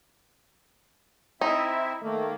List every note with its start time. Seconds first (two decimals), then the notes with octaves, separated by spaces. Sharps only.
1.41 C4 D#4 E4 E5
2.02 D#3 A3 A#3